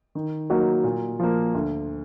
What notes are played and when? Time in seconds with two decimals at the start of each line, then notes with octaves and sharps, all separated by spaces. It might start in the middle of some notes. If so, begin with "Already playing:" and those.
0.15 D#3
0.50 F#3 A#3 D#4 F#4
0.84 A#2
1.20 F3 A#3
1.55 D2